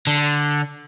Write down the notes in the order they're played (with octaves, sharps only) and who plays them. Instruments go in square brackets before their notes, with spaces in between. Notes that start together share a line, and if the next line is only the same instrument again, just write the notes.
[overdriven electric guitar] D3